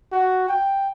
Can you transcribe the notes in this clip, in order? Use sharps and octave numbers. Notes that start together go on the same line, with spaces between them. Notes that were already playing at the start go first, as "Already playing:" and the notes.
F#4
G5